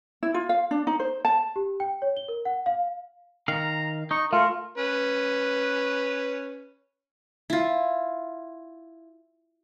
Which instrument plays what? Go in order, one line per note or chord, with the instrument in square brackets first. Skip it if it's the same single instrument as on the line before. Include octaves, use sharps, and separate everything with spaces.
[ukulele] E4
F4
F5
D4
D#4
C5
A5
[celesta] G4
G5
C#5
G7
A#4
F#5
F5
[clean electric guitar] D#3 F5 [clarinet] A#5
[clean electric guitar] D#4 [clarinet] C#6
[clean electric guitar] A3 [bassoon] F4 [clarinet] A#4
[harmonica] C#4 B4
[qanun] E4 F4